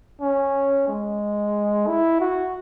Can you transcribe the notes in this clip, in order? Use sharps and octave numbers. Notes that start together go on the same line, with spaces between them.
C#4
G#3
E4
F#4